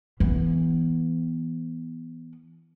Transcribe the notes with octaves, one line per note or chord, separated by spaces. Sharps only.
E3 B3